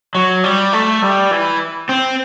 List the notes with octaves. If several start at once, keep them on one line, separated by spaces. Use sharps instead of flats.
F#3
G3
A3
G3
E3
C4